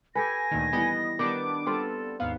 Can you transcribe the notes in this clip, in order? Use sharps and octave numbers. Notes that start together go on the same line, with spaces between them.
G4 A4 B4 G#5 A#6
D2 A#2 D#3
E3 G3 B3 D#5
D#3 G3 B3 D4 D6
G3 C4 F4 A4
D#2 G#2 B3 F5